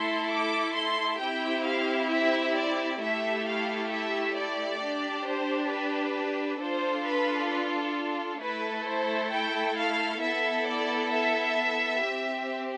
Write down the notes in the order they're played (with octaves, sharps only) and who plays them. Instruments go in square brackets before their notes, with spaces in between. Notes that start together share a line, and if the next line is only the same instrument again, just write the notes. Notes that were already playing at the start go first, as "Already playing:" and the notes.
Already playing: [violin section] A3 E4 A4 C6
D6
C6
C4 E4 G4 G5
F5
E5
D5
A3 E4 G4 E5
F5
E5
D5
D4 G4
C5
B4
D4 F4 A4 C5
B4
A3 E4 A4 B4
C5
G5
F5
B3 E4 A4 E5
D5
E5
C4 G4